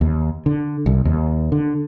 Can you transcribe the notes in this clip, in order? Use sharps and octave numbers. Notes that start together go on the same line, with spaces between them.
D#2
D3
C2
D#2
D3